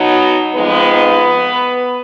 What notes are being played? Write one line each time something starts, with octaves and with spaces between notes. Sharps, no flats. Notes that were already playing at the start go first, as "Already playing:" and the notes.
Already playing: B2 F#3 B3 D#4
F2 F3 G#3 B3 D#4 B4